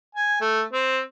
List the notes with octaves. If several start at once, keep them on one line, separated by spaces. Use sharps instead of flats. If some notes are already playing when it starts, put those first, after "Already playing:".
G#5
A3
C4